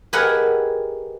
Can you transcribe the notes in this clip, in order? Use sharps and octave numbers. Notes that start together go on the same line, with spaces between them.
G4 G#4 A#4 B4 D#5 F#5